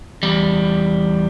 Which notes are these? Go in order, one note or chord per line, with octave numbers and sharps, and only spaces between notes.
E2 G3